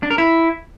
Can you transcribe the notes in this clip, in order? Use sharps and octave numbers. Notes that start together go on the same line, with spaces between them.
D4
A#4
E4